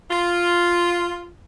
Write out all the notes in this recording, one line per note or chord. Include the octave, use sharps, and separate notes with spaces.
F4